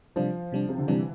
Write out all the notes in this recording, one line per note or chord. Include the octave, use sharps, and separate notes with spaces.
C3 F3 G3 D4
C3 G3 D4
C3
D3
C3 E3 G3 D4